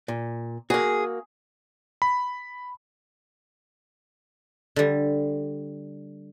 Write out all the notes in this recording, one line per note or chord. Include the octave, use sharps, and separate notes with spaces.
A#2
A#3 F#4 G#4
B5
D3 G3